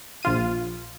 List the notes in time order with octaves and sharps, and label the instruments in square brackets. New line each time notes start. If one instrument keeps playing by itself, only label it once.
[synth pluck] A#1 F4 D#7